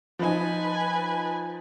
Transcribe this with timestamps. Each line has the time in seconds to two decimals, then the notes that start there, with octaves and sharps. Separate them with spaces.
0.19 F3 D#4 B4 G#5